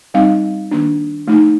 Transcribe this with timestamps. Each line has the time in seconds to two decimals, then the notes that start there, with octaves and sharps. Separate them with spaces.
0.14 G3 C4 D#4 F5
0.71 D#3 A#3 D4
1.27 F3 A3 D#4